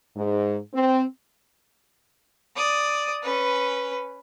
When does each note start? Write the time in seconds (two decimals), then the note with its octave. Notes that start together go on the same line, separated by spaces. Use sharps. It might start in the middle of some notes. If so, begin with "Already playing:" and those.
0.15 G#2
0.74 C4
2.56 D5 D#6
3.22 C#4 B4